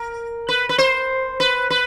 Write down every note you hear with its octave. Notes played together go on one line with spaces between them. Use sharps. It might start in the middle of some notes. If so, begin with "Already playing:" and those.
Already playing: A#4
B4
B4
C5
B4
B4